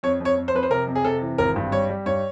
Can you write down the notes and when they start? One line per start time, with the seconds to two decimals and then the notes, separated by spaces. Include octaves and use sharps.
0.03 F2 C#5
0.20 F2
0.25 C#5
0.38 F2
0.48 C5
0.54 F2 B4
0.63 C5
0.70 C3 A#4
0.87 F2
0.95 G#4
1.04 C3 A4
1.22 E3
1.38 G#1 A#4
1.56 G2
1.72 G3 C#5
1.90 G3
2.06 G2 C#5